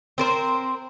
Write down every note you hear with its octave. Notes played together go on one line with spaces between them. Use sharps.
C4 A#4 C5